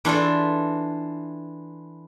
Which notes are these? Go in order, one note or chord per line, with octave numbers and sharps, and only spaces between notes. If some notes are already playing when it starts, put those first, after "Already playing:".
E3 D4 F4 A4